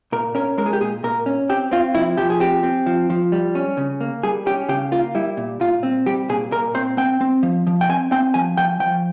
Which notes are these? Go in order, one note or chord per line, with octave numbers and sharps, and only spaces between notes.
A#2 A#4
C#4 A#4
G#3 A#4
G#4
G4
A#2 G#4
A#2 A#4
C#4
C4 G4
C4 F4
F3 E4
F3 G4
G#4
C4 G4
C4
F3
F3
G3
C#4
C#3
A#3
G3 G#4
C#4 G4
C#3 G4
A#3 F4
G3 E4
A#2
A#2 F4
C4
G3 G4
A#2 G#4
A#2 A#4
C4 C5
C4 G5
C4
F3
F3
G5
C4 G#5
C4 G5
F3 G#5
F3 G5
F3 G5